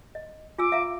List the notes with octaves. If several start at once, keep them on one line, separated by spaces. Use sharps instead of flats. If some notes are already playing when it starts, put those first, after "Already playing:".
D#5
F4 G#5 D6 E6
E5 F5 A#5